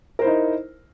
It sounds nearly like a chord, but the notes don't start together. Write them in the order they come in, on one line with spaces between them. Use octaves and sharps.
A#4 C5 E4 D#4